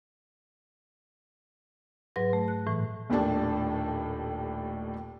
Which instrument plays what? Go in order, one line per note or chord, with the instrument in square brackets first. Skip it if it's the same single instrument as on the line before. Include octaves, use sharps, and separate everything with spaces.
[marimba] G#2 F#3 B4 A#6
A3
F#6
A2 E3
[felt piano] D#1 D#2 A2 D4 A5